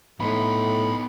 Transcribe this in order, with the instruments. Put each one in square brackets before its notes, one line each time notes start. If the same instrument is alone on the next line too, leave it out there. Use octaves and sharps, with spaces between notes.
[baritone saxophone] A2 [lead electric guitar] B3 D#4 [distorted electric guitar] B5 C6